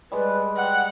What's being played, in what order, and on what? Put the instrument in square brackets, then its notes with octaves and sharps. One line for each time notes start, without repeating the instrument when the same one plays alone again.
[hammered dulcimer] G3 G#3 D5 [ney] B4
[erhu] F#5 [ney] G5